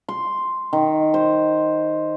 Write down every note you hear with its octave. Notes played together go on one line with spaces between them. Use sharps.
C6
D#3
C5